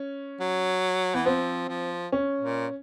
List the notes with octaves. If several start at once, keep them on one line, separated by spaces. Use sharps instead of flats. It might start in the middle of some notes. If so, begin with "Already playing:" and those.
Already playing: C#4
F#3
E3 B3
F3 C4
F3
C#4
A#2